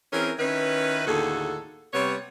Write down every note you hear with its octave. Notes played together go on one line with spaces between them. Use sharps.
E3 C4 C#4 G#4 A#4
D#3 C#4 E4 B4
D#2 A2 D3 F#4 G#4 A4
C3 G3 B3 C#5